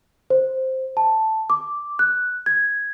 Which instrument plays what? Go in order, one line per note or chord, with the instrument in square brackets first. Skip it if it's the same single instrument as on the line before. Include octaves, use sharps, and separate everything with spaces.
[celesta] C5
A5
D6
F#6
G#6